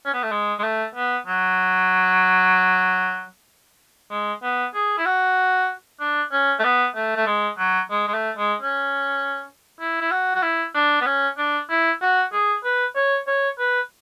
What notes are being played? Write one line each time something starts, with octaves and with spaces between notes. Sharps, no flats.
C#4
B3
A3
G#3
G#3
A3
B3
F#3
G#3
B3
G#4
E4
F#4
D4
C#4
A3
B3
A3
A3
G#3
F#3
G#3
G#3
A3
G#3
C#4
E4
E4
F#4
F#4
E4
D4
B3
C#4
D4
E4
F#4
G#4
B4
C#5
C#5
B4